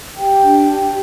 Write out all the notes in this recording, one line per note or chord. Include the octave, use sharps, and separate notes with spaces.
G4 G5
D4
G4